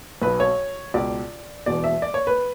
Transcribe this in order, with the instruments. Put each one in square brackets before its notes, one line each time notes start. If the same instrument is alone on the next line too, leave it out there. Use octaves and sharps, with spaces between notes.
[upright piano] B1 B2 B4
C#5
C#2 B2 D5
E1 E2 B2 D5
E5
D5
C#5
B4